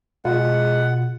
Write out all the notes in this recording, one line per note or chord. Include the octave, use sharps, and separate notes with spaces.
B2 G#3 F4 F#5